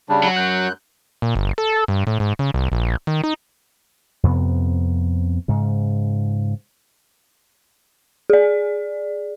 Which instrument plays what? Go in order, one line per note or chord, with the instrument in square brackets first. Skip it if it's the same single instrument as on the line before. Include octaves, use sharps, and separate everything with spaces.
[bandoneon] C#3 G3 D4
[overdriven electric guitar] F#3 F#4
[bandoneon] F#2 F#6 G6
[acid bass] A#2
G1
A4
G2
A2
G#2
C#3
C2
A#1
D#3
D#4
[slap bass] F2 C3 B3
G#2 C#3
[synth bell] G#4 D5